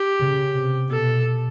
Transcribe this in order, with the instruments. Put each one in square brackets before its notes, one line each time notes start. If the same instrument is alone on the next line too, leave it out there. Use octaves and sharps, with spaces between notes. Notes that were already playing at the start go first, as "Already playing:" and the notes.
Already playing: [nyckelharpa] G4
[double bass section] C#3
C3
[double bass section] B2 [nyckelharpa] A4